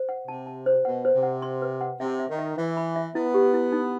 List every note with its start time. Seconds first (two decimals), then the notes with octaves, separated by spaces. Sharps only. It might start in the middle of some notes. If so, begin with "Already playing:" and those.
Already playing: C5
0.09 F#5
0.28 C3 A5
0.47 A5
0.66 C5
0.85 B2 F#5
1.05 C5
1.14 C3
1.23 F#5
1.42 C6
1.62 B4
1.81 F#5
2.00 C3 E5
2.19 E5
2.29 D#3
2.39 E5
2.57 E3 E5
2.77 B5
2.96 E5
3.15 B3 E4
3.34 G4
3.53 E4
3.72 D#4